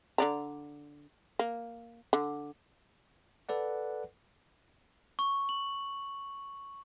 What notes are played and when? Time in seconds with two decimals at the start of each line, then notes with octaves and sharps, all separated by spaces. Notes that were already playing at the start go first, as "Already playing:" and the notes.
0.18 D3 D5 A#5
1.39 A#3
2.13 D3
3.49 A4 B4 D5 F#5
5.19 C#6
5.49 F#7